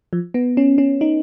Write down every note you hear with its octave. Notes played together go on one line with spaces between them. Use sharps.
F3
B3
C#4
C#4
D#4